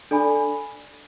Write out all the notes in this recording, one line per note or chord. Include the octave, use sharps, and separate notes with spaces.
D4 A4 D5 G#5 B5